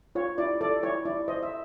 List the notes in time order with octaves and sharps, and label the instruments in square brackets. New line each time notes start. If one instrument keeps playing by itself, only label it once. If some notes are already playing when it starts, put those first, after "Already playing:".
[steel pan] F4 C#5
E4 D5
A4 D5
E4 C#5
E4 D5
C5 D#5
E5